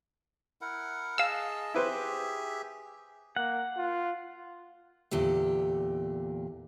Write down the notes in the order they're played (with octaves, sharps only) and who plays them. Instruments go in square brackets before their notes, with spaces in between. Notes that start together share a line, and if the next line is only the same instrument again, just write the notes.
[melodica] E4 A#4 F#5
[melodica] G#4 D#5 A5 [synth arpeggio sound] F5 E6
[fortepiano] E4 B4 C5 [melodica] G4 G#4 E5
[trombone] A#3 [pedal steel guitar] F#5
[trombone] F4
[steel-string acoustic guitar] E2 A#2 D3 G4